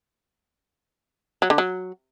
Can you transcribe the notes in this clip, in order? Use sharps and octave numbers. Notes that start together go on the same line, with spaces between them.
F#3
D3
F#3